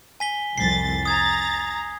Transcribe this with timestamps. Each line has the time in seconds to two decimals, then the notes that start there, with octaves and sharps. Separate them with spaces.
0.20 G#5 B6 G7
0.58 C2 F2 A6 B6 C7
1.06 A#5 D#6 G#6 A6